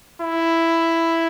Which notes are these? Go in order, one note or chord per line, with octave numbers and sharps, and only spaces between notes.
E4